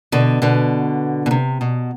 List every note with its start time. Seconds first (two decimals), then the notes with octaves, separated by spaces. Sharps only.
0.12 B2 D3
0.42 B2 D3
1.26 B2
1.31 C3
1.61 B2